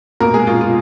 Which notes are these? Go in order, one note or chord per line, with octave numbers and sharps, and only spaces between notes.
B2 A#3 A#4
G#3 G#4
B2 F4
F4